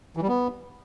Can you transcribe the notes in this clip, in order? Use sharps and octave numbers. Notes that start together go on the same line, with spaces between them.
E3
G3
B3